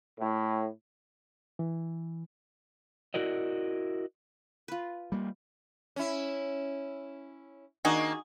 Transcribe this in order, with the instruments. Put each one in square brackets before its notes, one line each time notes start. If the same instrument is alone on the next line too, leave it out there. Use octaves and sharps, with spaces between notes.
[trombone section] A2
[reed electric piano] E3
[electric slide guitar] E4 F#4 A#4 D5 D#5
[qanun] F4 B4
[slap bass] G3 A#3
[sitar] C#4 E4
[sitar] D#3 A#3 D4 [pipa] D#4 F#4 G#4